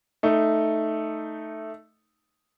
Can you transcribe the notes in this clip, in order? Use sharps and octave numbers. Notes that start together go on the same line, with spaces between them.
A3 D#4